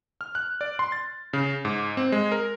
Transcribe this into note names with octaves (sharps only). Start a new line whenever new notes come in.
F6
F#6
D5
C6
A6
C#3
G#2
C4
G#3
A#4